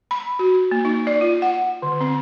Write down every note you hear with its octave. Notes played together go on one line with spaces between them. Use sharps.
B5
F#4
A#3
D#4
D5
F4
F#5
D3
C4